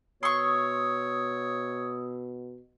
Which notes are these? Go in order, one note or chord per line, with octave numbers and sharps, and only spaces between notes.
B2 C#5 C6 C#6 D#6 E6